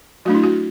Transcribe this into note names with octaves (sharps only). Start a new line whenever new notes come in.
F#3 A3 D4 F#4
E4
F#4